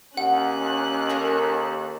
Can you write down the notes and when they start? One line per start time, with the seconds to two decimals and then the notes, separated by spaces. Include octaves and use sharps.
0.17 D#2 C#4 F#5 F#6
1.10 A#3 A4 A#4